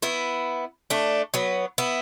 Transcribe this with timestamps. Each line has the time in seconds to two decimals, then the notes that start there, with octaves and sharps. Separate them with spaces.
0.02 B3 E4
0.90 A3 D4
1.34 F#3 B3
1.78 B3 E4